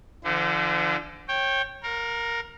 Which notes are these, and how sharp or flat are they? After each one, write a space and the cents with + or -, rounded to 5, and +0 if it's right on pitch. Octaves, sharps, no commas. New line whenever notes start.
D3 +10 F3 -40 C5 -45
C#5 -25 G5 +0
A#4 +0 F5 +45